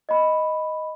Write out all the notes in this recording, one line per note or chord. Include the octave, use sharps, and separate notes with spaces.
D#5 B5